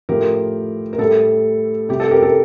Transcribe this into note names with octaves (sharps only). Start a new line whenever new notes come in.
A2 F3 G4 A#4
A#4
A2 G3 A4
C3 G3 G4
A4
G4 A#4
A4